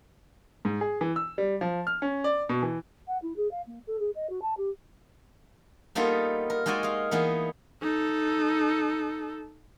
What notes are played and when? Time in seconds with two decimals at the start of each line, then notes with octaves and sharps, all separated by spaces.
0.65 G#2
0.81 G#4
1.01 E3
1.16 E6
1.38 G3
1.61 F3
1.87 F6
2.02 C#4
2.24 D5
2.49 B2
2.63 E3
3.07 F#5
3.22 E4
3.36 G#4
3.51 F5
3.66 A#3
3.87 A4
3.99 G#4
4.15 D#5
4.29 F#4
4.42 A5
4.57 G4
5.95 G3 A#3 B3 D#4 F4 A4
6.50 A#4
6.66 G#3 D#4 F#4 D5 G#5 C6
6.83 G#4 F5
7.11 E3 A#3 B3 D#4 G#4
7.82 D#4 A4